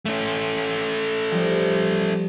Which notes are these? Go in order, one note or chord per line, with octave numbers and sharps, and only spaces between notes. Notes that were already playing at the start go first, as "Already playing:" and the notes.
A3 C#4
F3 G3